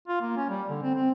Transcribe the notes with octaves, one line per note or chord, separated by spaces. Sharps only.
F4
A#3
C#4
G3
D3
C4
C4